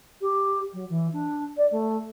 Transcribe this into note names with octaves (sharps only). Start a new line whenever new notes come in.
G4
F#3
E3
D4
D5
A3